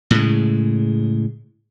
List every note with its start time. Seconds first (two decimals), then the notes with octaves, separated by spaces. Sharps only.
0.11 A2 C#3 G#3